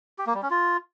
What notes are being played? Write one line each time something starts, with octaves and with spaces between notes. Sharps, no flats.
G4
A#3
G3
C#4
F4